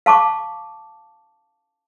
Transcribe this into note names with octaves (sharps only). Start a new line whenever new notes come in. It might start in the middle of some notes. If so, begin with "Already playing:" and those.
F5 A5 C#6 D6